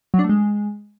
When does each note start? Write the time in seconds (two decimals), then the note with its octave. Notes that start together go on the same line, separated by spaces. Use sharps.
0.14 F#3
0.19 D4
0.24 A3
0.29 G#3